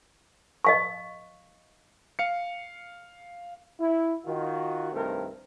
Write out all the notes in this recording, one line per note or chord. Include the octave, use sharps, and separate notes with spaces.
D#5 F5 C#6
F5 C#7
E4
D#3 F4 F#4
C2 G2 D#3 A3 C4 A#4